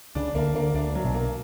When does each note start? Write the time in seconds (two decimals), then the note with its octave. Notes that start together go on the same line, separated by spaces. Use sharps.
0.15 C#2 C#3 D4
0.35 D2 D3 A#3
0.55 D2 D3 A#3
0.74 D2 D3 D4
0.95 F#3
1.04 B1 B2
1.14 A#3